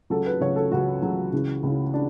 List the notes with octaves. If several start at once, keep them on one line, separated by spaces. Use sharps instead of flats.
C#2 C#3 F#3 A4
B4
C#2 C#3 F#3 C#5
A4
C#2 C#3 F#3 F#4
C#2 C#3 F#3
C#2 C#3 E3
C#2 C#3 E3
D4